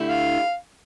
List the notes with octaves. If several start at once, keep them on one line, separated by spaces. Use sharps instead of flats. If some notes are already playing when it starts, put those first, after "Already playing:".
Already playing: D3 A3 E4 G4
F5